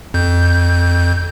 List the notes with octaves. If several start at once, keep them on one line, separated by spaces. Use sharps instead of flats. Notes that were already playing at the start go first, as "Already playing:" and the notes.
F2 G6